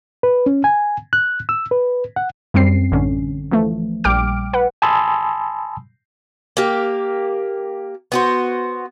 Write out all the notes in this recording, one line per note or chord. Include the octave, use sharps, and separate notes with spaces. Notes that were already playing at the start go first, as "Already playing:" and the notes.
B4
C#4
G#5
F#6
E6
B4
F#5
F#2 G3 C4 C7
A1 D3 C#4
E3 F3 A3
A#1 G3 G5 D6 F6 D7
B4 F#5
G#5 A5 B5 C6 D#6 E6
A#3 G4
B3 F#4 C5